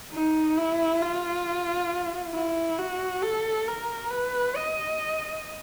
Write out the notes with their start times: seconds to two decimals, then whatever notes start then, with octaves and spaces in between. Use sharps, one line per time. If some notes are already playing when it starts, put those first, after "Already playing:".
0.12 D#4
0.57 E4
1.02 F4
2.35 E4
2.79 F#4
3.23 A4
3.67 A#4
4.11 B4
4.56 D#5